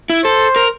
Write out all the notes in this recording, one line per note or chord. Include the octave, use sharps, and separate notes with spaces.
E4
A4 C5
A#4